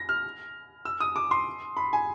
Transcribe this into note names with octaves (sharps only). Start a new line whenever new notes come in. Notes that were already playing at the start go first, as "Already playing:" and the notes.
Already playing: A#6
F6
E6
D#6
D6
C6
B5
G#5